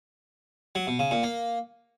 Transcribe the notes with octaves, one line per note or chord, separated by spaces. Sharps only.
F#3
B2
C#3
A#2
A#3